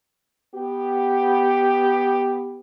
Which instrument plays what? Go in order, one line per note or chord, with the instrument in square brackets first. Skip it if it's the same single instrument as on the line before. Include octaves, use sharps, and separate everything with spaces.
[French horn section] B3 G4